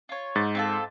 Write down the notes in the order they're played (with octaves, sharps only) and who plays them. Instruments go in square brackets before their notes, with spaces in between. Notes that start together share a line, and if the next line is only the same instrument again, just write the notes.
[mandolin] F4 C#5
[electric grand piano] G#2 A6
[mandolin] C4 F4 A4